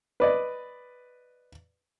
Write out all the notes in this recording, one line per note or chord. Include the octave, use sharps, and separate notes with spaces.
B4 D5 D#5